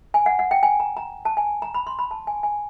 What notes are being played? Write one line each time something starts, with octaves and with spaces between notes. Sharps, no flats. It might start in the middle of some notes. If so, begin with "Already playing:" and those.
G#5
F#5
F#5
G5
G#5
A#5
A#5
A5
G#5
A#5
B5
C6
B5
A5
G#5
G#5